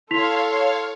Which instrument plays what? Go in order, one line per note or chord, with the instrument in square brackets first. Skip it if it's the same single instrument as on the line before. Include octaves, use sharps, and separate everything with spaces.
[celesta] E4 B6 F7 [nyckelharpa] A4 [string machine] C#5 F5 [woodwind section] C6